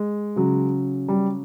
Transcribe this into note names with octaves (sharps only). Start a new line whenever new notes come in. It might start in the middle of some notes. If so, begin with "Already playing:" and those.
Already playing: G#3
C#3 F#3
G3